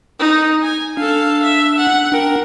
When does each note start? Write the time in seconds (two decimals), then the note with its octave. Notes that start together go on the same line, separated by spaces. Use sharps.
0.20 D#4
0.62 G#5
0.97 D4 A4 F5
1.43 E5
1.78 F#5
2.12 D4 A#4 G5